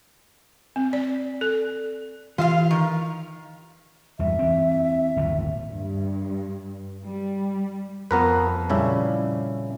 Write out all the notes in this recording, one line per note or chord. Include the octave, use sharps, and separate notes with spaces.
C4
D5
A4
E3 F4 G4 E5 F5
D#3
E2 G2 E5
E3 C4
G1 D#2 A2
G2
G3
F2 B3 A#4 B4 C#6
A#2 C#3 G3 C#4 E4